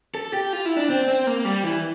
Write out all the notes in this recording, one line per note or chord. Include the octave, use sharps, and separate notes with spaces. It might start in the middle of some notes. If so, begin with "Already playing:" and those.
A4
G4
F4
E4
D4
C4
C4
A#3
G3
E3